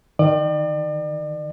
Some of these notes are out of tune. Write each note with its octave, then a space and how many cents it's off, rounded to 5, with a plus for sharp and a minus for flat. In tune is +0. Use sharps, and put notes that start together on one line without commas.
D#3 +0 D5 +40